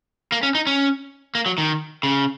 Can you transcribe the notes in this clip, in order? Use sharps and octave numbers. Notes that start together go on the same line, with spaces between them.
A#3
C#4
D#4
C#4
A#3
F#3
D#3
C#3